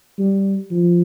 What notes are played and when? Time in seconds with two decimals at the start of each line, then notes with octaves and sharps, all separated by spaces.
0.19 G3
0.71 F3